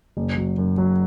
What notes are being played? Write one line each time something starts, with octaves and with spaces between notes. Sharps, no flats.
F#1
F#3
F#2
F#3